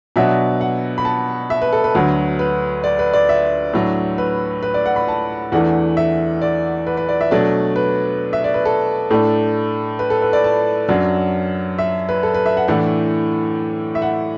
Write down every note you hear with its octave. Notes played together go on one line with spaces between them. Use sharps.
B2 F#3 B3 D4 E5
F#5
B5
A5
E5
B4
A4
B4
D2 D3 F#3
B4
D5
B4
D5
E5
A2 F#3 D4
B4
B4
D5
F#5
B5
A5
E2 E3 A3 D4 F#5
E5
D5
B4
B4
D5
E5
B2 F#3 A3 D4 D5
B4
E5
D5
B4
A4
A2 A3 D4
B4
A4
B4
D5
A5
F#2 F#3 D4
E5
B4
A4
B4
E5
F#5
A2 E3 A3 D4 F#5
E5
F#5